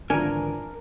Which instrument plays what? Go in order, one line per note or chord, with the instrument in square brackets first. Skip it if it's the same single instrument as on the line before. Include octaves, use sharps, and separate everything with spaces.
[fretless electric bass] G#1 D3 E3 [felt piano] F3 D4 [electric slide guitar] A#4 A#5 [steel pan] G#5